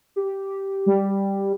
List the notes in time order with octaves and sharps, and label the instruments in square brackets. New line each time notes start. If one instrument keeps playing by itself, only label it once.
[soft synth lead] G4
[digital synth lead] G3